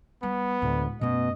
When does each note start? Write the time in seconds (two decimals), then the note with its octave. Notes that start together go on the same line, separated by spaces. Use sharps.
0.23 G3 B3
0.62 D2 A2 G#3
1.01 F#2 B2 A3 D#5